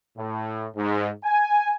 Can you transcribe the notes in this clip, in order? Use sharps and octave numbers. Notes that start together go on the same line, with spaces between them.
A2
G#2
G#5